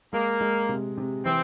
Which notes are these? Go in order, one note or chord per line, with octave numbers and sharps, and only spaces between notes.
G#3 A#3
G#3
C3
C3
E3 C4